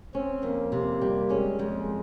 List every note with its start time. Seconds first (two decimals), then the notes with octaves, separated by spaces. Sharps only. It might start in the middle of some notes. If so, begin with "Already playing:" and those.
0.15 C4 C#4
0.43 F2 A#3
0.72 C3
1.01 G3
1.30 G#3 C#4
1.59 F2 G#3